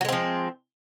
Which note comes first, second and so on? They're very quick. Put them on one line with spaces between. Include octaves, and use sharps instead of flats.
F#3 G#3 C4 F3